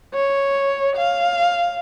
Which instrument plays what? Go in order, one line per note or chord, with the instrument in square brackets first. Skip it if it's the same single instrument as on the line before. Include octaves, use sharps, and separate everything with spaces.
[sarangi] C#5
F5